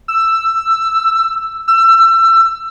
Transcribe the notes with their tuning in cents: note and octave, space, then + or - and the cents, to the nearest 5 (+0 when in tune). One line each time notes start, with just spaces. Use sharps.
E6 +10
E6 +25